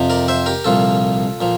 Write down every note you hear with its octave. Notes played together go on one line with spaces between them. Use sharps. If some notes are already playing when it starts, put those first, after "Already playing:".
Already playing: F2 C3 F3
A#4 D5
C5 E5
G4 A#4
C2 A#2 F3 F4 A4
A#2 F3